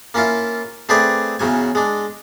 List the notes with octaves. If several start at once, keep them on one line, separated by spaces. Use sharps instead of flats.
A#3 C#4 E4 F4
A3 C4 G#4 B4 D5 G#5
E2 C#3 F#3 G#5
G#3 D4